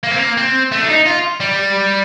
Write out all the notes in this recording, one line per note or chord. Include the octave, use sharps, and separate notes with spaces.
A#3
C4
A#3
C4
A3
D4
D#4
F4
G3